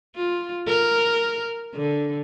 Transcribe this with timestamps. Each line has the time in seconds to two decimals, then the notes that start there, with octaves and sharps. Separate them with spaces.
0.16 F4
0.68 A#4
1.74 D3